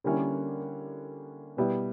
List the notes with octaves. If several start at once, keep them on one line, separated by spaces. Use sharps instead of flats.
D3 G3 A#3 C#4 E4
B2 G3 B3 E4